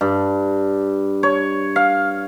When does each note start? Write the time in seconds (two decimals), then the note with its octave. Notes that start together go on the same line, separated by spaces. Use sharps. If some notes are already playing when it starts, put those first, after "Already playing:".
0.01 G2
1.23 C#5
1.76 F5